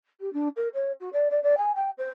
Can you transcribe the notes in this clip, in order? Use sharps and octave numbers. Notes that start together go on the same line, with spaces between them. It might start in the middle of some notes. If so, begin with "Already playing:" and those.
G4
D4
A#4
C#5
F#4
D5
D5
D5
G#5
G5
C5